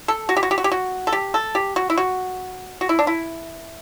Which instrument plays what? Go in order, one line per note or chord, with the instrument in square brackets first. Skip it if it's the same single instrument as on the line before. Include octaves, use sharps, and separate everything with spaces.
[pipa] A4
F#4
G4
F#4
G4
F#4
G4
F#4
A4
G4
A4
G4
F#4
E4
F#4
F#4
E4
D4
E4